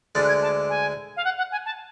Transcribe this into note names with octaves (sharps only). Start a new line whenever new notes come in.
D2 D3 G#3 D4 A6
F#6
G#6
A5
G#5
F5
F#5
F#5
G#5
A5